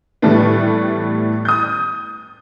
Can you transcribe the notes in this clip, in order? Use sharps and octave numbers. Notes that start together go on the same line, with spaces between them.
A2 E3 G3 A3 B3
D#6 G6